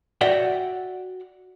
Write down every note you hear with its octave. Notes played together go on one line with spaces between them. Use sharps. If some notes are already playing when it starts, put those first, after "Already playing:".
F#4 D5 E5 F#5 G5